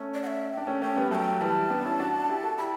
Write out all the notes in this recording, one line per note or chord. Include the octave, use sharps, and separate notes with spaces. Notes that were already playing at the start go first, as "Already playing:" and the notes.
Already playing: A3 C#4
D5
F#5
E5
G5
D4
A3 C#4
A3 C#4 G5
G3 B3
F#3 A3 G5 A5
E3 G3 A5
B3 D4
C#4 E4
D4 F#4
E4 G4
F#4 A4
E4 G4 B5